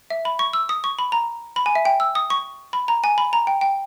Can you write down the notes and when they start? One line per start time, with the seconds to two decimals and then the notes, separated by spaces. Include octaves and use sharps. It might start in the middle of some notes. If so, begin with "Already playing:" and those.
0.10 E5
0.25 B5
0.39 C#6
0.53 E6
0.69 D#6
0.84 C#6
0.99 B5
1.12 A#5
1.56 B5
1.66 G#5
1.75 E5
1.85 G5
2.00 E6
2.15 D#6
2.30 C#6
2.73 B5
2.88 A#5
3.04 G#5
3.18 B5
3.33 A#5
3.47 G5
3.61 G5